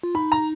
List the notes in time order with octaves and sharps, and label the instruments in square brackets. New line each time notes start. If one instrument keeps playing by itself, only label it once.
[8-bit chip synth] F4
[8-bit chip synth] D#4 [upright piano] B5
[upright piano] A#5